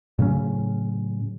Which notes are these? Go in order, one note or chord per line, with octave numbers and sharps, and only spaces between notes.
A2 C#3 F#3 C#4